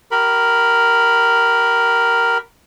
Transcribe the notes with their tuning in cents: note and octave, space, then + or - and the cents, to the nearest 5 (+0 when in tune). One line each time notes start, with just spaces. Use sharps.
G4 -30 A#4 +0 B5 +0